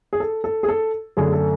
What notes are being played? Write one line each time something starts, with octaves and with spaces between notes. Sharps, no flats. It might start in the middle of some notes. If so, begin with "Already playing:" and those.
G#4
A4
A4
G#4
A4
F#2 D3 A3 G#4
A4